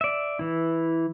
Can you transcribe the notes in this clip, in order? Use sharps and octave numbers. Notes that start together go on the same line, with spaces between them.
D5 E5
E3 E4